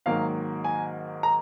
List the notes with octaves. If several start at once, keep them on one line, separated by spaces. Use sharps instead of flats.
G#2 D#3 F#3 A#3 F5
G#5
A#5